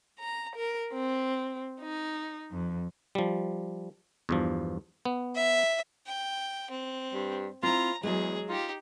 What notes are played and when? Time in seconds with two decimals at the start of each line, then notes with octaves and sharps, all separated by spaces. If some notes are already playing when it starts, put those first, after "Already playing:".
0.18 A#5
0.54 A#4
0.92 C4
1.80 D#4
2.53 F2
3.15 F3 G3
4.29 E2 G2 F3
5.05 B3
5.36 E5
6.07 G5
6.70 C4
7.14 G2
7.63 C4 E4 F4 A#5
8.03 E2 F#3 G#3 G#4
8.49 D#4 F4 G4